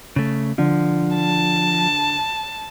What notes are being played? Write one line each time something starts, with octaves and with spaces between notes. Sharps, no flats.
C#3 A3
D3 F3
A5